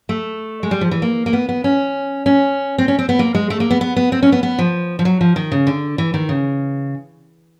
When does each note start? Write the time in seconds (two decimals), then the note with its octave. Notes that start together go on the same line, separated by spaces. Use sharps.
0.09 A3
0.63 G#3
0.71 G3
0.81 F3
0.91 E3
1.02 A#3
1.26 A#3
1.33 B3
1.49 B3
1.64 C#4
2.26 C#4
2.78 C4
2.88 C#4
2.99 C4
3.09 B3
3.19 A#3
3.35 G#3
3.50 A3
3.60 A#3
3.71 B3
3.81 B3
3.96 B3
4.12 C4
4.22 C#4
4.32 B3
4.43 B3
4.59 F3
4.99 F3
5.05 F#3
5.21 F3
5.36 D#3
5.52 C#3
5.67 D3
5.98 E3
6.14 D#3
6.29 C#3